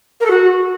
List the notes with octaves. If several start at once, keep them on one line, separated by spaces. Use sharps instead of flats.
A#4
A4
F#4